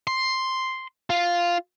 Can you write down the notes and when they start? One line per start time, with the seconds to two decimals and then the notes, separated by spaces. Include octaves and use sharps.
0.07 C6
1.10 F4